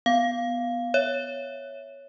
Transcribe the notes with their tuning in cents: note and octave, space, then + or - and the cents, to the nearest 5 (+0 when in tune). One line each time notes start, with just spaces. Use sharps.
B3 +0 F5 +0
C#5 +0 E5 +0